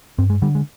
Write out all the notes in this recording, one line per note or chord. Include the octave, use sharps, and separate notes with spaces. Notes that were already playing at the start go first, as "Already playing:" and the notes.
G2 C4
G#3
D3 G3
G#3